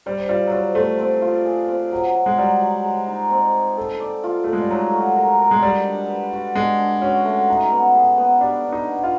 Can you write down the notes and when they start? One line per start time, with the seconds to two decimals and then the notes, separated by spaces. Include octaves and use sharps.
0.06 G3 C5
0.29 G3 F4
0.47 F#3
0.52 G3 C5
0.75 A3 C5
0.99 C4
1.22 F4
1.45 G#4
1.68 C4
1.92 F#3
2.15 F#3
2.26 G#3
2.38 F#3 G3
2.61 F#3
2.85 G#3
3.07 D#4
3.31 C4
3.54 G#3
3.77 A4
4.00 D5
4.24 F4
4.44 A3 A4
4.53 G#3
4.62 G3
4.70 F#3 D#4
4.93 F#4
5.16 A#4
5.39 A#4
5.51 G#3
5.63 G3 D#5
5.86 D4
6.09 B4
6.33 F#4
6.55 G#3 D4
6.79 D4
7.02 C#4 F#4
7.25 A3
7.48 D#4
7.71 B3
7.95 G#4
8.18 B3
8.41 G3 D4
8.64 D4
8.73 D#4
8.88 B3
9.03 F4